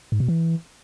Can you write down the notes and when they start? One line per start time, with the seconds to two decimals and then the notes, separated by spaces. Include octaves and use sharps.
0.12 G#2
0.20 B2
0.28 E3